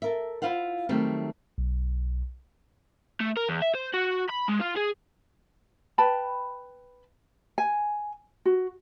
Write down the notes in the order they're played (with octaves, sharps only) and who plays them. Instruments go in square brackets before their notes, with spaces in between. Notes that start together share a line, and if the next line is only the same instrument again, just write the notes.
[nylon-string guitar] A4 A#4 E5
E4 F4 C5 F5 F#5
D#3 F#3 G3 A3 C4
[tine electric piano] B1
[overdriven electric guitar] A3
A#4
E2
E5
C5
F#4
B5
G#3
F4
G#4
[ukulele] B4 G5 A5 B5
G#5
F#4